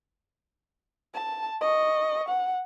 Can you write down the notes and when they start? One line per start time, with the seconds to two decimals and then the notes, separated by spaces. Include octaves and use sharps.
1.15 A5
1.61 D#5 C#6
2.28 F#5